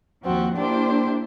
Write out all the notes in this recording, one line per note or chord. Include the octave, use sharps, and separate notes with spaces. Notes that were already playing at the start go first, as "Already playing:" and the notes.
D#2 F3 C4 F#4
A#3 D4 E4 G4 C5